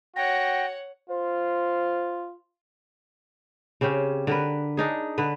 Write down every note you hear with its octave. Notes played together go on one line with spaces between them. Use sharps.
F#4 C#5 F#5 G5 A#6
F4 C5
C#3 C4 C#4 G4
D3 A#4 B4
D4 D#4 G#4
D3 B4